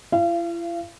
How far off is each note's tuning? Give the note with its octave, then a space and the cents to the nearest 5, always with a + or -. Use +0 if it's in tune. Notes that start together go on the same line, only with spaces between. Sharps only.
E4 +45 F5 -35